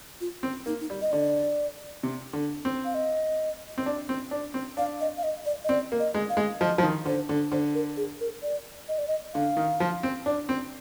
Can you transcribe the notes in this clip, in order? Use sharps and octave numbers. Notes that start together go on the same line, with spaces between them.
F4
C4
A#3 D#4
D#4
G3
D#5
D3 D5
C3
D3
C4
F5
D#5
C4
D4
C4
D4
C4
D4 F5
D#5
F5
D#5
D5
D#5
C4 D5
A#3
D#5
G#3
F5
G#3
F3 D#5
F3
D#3
D3 C5
D3
D3 C5
A#4
G#4
A#4
D5
D#5
D5
D#5
D3 F5
D#3
F3
C4
D4
C4